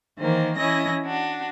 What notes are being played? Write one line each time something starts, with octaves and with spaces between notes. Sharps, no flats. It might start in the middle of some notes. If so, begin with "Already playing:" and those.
D#3 E3 A#3 C5
E3 C#4 E4 D#5 A#6
D4 F#4